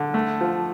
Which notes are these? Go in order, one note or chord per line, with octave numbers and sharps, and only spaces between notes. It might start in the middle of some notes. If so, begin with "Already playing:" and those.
Already playing: D3
A3
F3